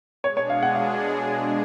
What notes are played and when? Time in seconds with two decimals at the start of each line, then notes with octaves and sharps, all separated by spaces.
0.24 B2 G#3 D4 G#4 C#5
0.37 C#5
0.50 F5
0.63 F#5
0.75 F5